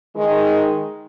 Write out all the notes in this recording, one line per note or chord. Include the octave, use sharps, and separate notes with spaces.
D#3 G#3